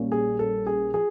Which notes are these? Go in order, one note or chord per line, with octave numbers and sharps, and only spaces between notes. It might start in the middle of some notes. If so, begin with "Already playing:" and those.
Already playing: A#1 A#2 G3 A#3 C#4
G#4
A4
G#4
F3 G#4